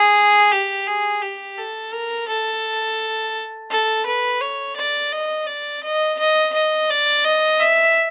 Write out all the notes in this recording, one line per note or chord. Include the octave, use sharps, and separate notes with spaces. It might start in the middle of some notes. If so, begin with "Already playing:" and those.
Already playing: G#4
G4
G#4
G4
A4
A#4
A4
A4
B4
C#5
D5
D#5
D5
D#5
D#5
D#5
D5
D#5
E5